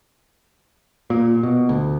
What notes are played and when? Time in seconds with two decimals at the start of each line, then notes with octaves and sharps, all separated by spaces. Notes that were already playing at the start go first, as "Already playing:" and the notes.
1.10 A#2
1.43 B2
1.69 D2